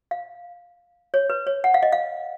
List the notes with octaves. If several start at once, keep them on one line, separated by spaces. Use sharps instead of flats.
F5
C#5
B4
C#5
F#5
F5
D#5
F5